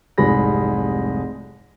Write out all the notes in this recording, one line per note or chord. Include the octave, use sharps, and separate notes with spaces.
F1 C2 G#2 G#4 B5 A#6